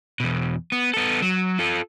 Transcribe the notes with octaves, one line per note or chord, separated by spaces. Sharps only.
E2 B2
B3
B3 A4
F#3
F4 A4